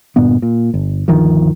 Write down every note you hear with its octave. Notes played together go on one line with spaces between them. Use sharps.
G1 G2 A#2 B3
A#2
G1
G1 D2 D#3 F3